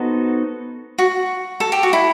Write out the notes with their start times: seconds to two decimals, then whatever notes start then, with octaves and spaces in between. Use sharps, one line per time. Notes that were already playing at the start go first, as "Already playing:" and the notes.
Already playing: B3 D#4 F#4 A4 C5
0.98 F#4
1.60 A4
1.72 G4
1.83 F#4
1.93 E4